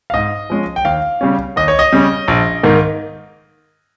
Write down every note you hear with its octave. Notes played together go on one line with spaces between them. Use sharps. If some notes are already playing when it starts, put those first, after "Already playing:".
F5
G#2 D#5
F3 G#3 C#4
G5
D#2 F5
C#3 G3 C#4
D#2 D#5
C#5
D#5
C#3 G3 C#4
A#1
G#2 D#3 A#3